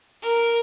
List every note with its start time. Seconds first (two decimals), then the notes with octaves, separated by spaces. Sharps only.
0.23 A#4